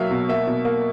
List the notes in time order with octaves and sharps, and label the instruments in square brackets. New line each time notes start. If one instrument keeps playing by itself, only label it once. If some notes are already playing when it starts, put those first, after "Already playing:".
Already playing: [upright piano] B2 F#3 A#3 E5 F5
B2
A#3 E5
B2
A#3